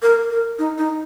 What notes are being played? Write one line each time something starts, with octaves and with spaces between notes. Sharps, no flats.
A#4
A#4
D#4
D#4